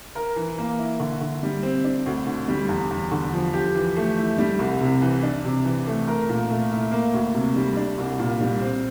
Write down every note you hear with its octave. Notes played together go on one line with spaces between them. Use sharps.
A#4
E3
A#3
E4
D3
D3
G3
C4
D4
D2
D3
G3
E2
E2
D3
F3
G4
E3
A3
E4
G3
C2
C3
E3
D4
C3
E3
A3
A#4
A#2
A3
E4
A#3
D2
C3
G3
D4
C2
A#2
G3
C4